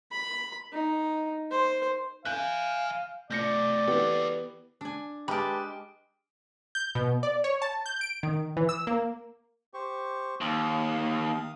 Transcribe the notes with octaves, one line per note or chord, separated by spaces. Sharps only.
B5
D#4
C5
E5 F5 G#5 F#6 G6
A3 F4 D5 G6 A#6 C#7
E3 B3 F#4 G4 A4
D4 G#5
G#3 G4 B4 A5 D6 F6 D7
G6
B2
D5
C#5
A5
G6
D7
D#3
E3
E6
A#3
G4 C5 C#6
D#2 F5 D#6